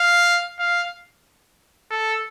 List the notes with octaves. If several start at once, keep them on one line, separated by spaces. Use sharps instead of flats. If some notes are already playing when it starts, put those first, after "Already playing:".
Already playing: F5
F5
A4